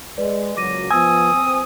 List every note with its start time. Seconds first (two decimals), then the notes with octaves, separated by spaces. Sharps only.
0.18 G#3 B4 D5
0.57 A#2 C#3 F#3 D6 A#6 D#7
0.91 F3 B3 G#5 D#6 E6
1.33 C4